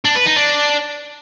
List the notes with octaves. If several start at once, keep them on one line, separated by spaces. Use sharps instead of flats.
D4
B4
D#4
D4